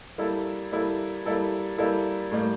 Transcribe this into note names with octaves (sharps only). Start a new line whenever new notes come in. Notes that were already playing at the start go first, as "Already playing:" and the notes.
G3 A#3 E4 A4
G3 A#3 E4 A4
G3 A#3 E4 A4
G3 A#3 E4 A4
A2 G3 A#3